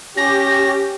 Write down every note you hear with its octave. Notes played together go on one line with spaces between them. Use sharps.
C#4 G4 A#6